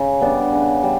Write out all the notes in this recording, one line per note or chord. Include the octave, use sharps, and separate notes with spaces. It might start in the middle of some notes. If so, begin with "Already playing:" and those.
Already playing: C#3
G3 B3 D4
C#3
G3